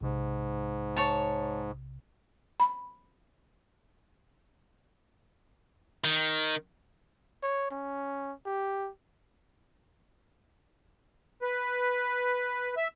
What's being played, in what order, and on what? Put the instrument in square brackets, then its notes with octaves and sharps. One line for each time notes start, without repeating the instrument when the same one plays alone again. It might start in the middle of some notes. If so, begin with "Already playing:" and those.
[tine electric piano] B1 C3 [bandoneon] G#2
[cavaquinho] C#5 A5
[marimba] B5
[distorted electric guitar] D#3
[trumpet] C#5
C#4
G4
[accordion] B4
E5